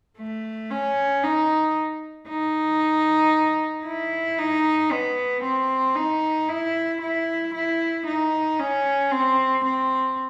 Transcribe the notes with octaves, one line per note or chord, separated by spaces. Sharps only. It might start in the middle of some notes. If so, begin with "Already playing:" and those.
A3
C#4
D#4
D#4
E4
D#4
B3
C4
D#4
E4
E4
E4
D#4
C#4
C4
C4